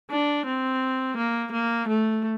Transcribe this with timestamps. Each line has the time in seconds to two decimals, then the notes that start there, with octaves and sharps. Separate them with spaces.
0.11 D4
0.46 C4
1.17 A#3
1.52 A#3
1.88 A3